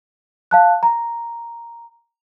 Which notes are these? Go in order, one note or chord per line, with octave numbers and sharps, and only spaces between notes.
F5 A5 F#6
A#5